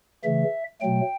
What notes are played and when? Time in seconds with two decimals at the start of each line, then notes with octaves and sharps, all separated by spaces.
0.24 C#3 E3 A3 E5
0.81 B2 F#3 A3 G5